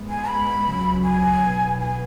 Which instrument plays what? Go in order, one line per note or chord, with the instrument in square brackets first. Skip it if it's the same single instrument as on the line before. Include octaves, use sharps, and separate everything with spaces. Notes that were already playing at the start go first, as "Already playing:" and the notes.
Already playing: [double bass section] G#2 G#3 B3
[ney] G#5
B5
[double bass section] C#2 C#3 F#3 C#4
[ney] G#5
[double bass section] B1 B2 B3
[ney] G#5